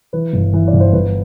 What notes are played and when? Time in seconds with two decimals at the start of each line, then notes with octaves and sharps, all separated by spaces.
0.13 E3 B4
0.33 G1
0.53 E3
0.68 D5
0.73 G1
0.80 C5
0.93 G1 B4